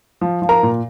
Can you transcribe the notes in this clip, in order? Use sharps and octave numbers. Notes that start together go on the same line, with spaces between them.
F3
F3
A#4 A#5
A#2